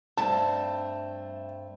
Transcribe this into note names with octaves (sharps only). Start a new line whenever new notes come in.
G2 A3 C4 A5